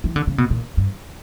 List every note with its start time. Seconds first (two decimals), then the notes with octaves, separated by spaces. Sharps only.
0.04 E3
0.16 D3
0.27 C#3
0.38 B2
0.50 A#2
0.77 G2